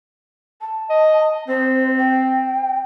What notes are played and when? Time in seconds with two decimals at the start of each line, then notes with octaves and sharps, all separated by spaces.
0.61 A5
0.90 D#5
1.48 C4 C5
1.98 G5